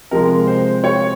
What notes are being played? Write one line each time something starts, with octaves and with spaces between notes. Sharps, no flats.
C3 F3 G#3 A#4
C5
C#5